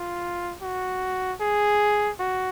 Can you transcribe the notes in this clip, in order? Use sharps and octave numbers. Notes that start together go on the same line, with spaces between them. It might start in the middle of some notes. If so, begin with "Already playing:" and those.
Already playing: F4
F#4
G#4
F#4